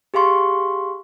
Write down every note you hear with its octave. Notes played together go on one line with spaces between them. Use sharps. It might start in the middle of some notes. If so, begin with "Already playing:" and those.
G4 G#4 F5 C6 C#6